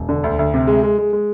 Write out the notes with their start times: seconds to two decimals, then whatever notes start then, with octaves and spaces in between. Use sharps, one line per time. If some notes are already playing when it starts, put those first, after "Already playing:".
Already playing: E1
0.09 D3
0.24 D2
0.39 D2
0.54 C3
0.67 G#3
0.83 G#3
0.98 G#3
1.13 G#3